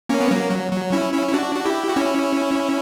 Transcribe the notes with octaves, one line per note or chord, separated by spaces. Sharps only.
A#3 C#4
B3
F#3 A#3
F#3
F#3
C#4 E4
C#4 E4
E4
D4 F#4
F#4
E4 G4
F#4
C#4 E4